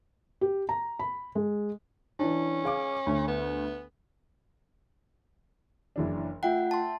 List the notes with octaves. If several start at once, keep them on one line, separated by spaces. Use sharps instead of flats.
G4
A#5
B5
G#3
E3 C#4 D4
G#4 F5 D6
D2
B3
F#1 E3 D4
A3 F4 E5 F#5 G5
A5 C6